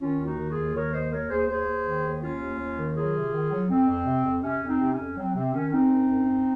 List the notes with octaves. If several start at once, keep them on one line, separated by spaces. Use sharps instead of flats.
D#3 C#4 F4
D#2
D#4 F#4
D#3
F4 G#4
D#2
D#3 A#4 C#5
D#2 C5 D#5
D#2 A#4 C#5
D#2 G#4 C5
D#2 G#4 C5
D#2
D#3
D#2
D#2 C#4 F4
D#2
D#2
D#3
F#3 F4 G#4
C3
D#3
F#3
F2 C4
F2
C3
F2
C3 C#4
F2
C4 D#4
C3
C#4
F2
F#3 C4
C3 C4
D#3 C#4
F2 C4 D#4
F#2
F#2
F#2